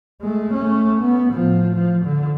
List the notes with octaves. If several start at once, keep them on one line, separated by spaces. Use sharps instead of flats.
G#3 A3
A3 C#4
B3
A2 F3
F3
D3